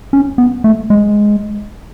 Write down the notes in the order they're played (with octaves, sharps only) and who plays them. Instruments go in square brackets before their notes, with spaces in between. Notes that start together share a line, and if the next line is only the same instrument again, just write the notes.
[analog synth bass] C#4
B3
A3
G#3